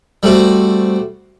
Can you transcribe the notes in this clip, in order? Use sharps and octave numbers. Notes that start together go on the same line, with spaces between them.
G3 A3 C4 F#4